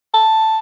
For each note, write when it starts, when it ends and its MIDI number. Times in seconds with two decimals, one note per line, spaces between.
0.14 0.58 81